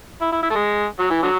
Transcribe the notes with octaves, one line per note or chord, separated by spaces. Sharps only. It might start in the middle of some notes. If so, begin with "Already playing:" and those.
E4
E4
E4
A3
G#3
F#3
E3
D3 F#3